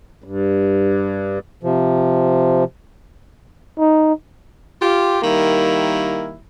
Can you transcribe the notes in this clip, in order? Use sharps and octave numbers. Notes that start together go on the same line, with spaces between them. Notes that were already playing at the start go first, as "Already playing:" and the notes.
G2
C3 F3
D#4
F4 G4
D#3 G3 A#3 E4